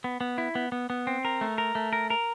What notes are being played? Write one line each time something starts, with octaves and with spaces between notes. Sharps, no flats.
B3
B3
E4
B3
B3
B3
C4
A#4
A3
A#4
A3
A#4
A#4